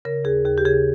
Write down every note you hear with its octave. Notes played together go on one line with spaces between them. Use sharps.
C#3 A#4
D#2 G#4
D#2 G#4
G4
C#3 G#4